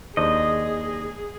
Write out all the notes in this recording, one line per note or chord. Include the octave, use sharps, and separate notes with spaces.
D#2 D4 G#4 C5 D#5